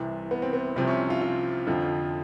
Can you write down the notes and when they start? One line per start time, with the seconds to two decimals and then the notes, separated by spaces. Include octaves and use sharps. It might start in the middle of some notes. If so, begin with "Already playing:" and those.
Already playing: C2 C3 E3
0.31 B3
0.42 C4
0.53 B3
0.76 C2 C3 F3 C4
0.87 C#4
1.10 F4
1.21 F4
1.67 F2 D3 F3